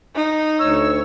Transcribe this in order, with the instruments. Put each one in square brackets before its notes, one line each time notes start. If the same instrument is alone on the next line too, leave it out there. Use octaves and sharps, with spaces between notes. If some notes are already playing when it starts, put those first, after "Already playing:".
[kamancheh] D#4
[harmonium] D2 C#5 [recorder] E6